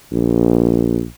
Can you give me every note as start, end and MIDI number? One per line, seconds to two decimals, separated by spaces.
0.12 1.05 34